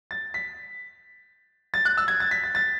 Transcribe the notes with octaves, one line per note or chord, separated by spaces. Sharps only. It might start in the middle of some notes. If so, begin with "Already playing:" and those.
A6
B6
A6
F#6
E6
G#6
A6
B6
A6
A6